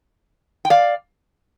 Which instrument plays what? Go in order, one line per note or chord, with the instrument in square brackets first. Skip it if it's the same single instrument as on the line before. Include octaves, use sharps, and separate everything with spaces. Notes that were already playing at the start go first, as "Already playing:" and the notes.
[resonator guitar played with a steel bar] G5
D5 F5